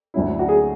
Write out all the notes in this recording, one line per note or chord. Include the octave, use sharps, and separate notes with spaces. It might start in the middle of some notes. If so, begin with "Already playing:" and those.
D2 D3 F#3 C#4 E4
F#4
G#4